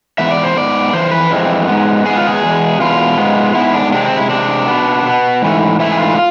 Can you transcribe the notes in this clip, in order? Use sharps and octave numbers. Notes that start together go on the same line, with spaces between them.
G#2 E3 B3 E5
D5
C5
G#2 E3 B3 D5
F2 E3 C5
B4
F2 E3 G#3 C4
G#2 G#3 B3
G#2 G#3 B3 G#4
F4
G#4
E2 B2 G#3
E2 B2 G#3 F4
G#2 G#3 B3
G#2 G#3 B3 E4
D4
C3 G#3 C4 D4
C4
E4
C3 G#3 C4 D4
B2 B3
B2 B3
G#2 E3 A3
G#2 E3 A3 E4
G#4
F4